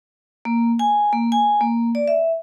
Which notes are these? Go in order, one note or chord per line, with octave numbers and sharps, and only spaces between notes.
A#3
G#5
A#3
G#5
A#3
D5
E5